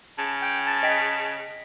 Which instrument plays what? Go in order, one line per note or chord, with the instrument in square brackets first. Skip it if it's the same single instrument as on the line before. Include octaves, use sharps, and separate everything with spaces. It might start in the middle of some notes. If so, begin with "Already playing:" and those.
[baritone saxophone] C#3 [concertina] A5
[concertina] G5
[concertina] A5 [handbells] A6
[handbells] D#5 G5 B6